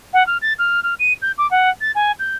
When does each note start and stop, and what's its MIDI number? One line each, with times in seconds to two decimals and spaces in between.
0.13 0.26 78
0.27 0.38 89
0.42 0.53 93
0.59 0.83 89
0.83 0.94 89
0.99 1.13 99
1.22 1.32 91
1.38 1.49 86
1.51 1.70 78
1.81 1.92 93
1.95 2.12 80
2.19 2.37 91